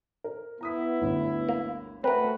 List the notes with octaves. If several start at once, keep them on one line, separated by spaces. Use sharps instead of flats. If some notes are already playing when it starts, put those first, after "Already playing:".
A#4 C5
B3 E4 A#5 D#6 B6
G1 D2 A2
A#3
A3 C4 F#4 A#4 B4